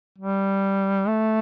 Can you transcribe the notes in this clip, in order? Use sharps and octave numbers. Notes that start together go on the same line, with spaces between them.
G3
A3